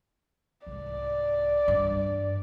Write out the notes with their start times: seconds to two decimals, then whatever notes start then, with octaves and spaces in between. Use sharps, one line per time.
0.67 C2 G#2 D5
1.68 E2 G2